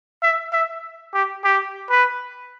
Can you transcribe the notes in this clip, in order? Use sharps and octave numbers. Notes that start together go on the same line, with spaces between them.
E5
E5
G4
G4
B4